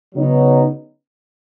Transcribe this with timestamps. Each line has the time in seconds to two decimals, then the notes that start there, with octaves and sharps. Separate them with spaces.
0.14 C#3 F#3 B3 D#4